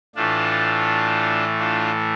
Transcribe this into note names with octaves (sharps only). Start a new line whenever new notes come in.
A2 E3 A3 D4 F4
D4 F4